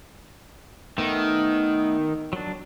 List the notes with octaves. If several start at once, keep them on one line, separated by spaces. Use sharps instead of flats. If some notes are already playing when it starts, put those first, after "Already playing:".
D#3 A3 B3
F#3 D4